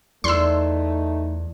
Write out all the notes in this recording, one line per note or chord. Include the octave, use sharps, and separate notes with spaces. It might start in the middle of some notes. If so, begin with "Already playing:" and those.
E2 A3 D#4 D5 C6 E6